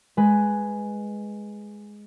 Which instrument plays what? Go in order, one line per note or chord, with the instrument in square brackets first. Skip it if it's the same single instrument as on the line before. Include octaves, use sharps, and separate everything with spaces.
[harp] G#3 B4 G#5